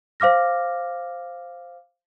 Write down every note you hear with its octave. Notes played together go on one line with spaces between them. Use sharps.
C5 F5 D6 F6 A#6